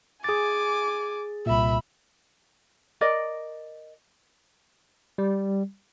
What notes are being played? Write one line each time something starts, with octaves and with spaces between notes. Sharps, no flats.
G#4 G#5 D6 A6
C2 A#2 E5 B5
A#4 D5 D#5
G3